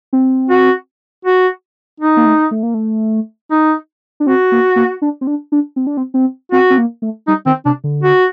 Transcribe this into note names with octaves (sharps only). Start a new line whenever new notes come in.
C4
F#4
F#4
D#4
A#3
A3
A3
A#3
A3
D#4
D4
C4 F#4
A#3
A#3
D4
C4
D4
D4
C4
D4
C4
C4
C4 F#4
C4
A#3
A3
G3 D#4
D#3 C4
C3 D4
D3
F#4